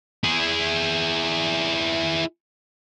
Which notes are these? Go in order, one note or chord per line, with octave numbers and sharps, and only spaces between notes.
E4 G#4